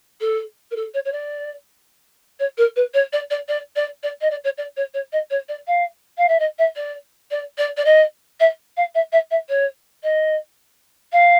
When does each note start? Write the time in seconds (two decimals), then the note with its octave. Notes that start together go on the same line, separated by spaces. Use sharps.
0.21 A4
0.71 A#4
0.76 A4
0.94 C#5
1.05 C#5
1.12 D5
2.39 C#5
2.57 A#4
2.76 B4
2.94 C#5
3.12 D5
3.30 D5
3.48 D5
3.76 D5
4.03 D5
4.21 D#5
4.30 D5
4.44 C#5
4.57 D5
4.76 C#5
4.94 C#5
5.12 D#5
5.30 C#5
5.48 D5
5.67 F5
6.17 F5
6.28 E5
6.39 D#5
6.58 E5
6.76 D5
7.31 D5
7.58 D5
7.77 D5
7.85 D#5
8.40 E5
8.76 F5
8.94 E5
9.12 E5
9.30 E5
9.49 C#5
10.03 D#5
11.12 F5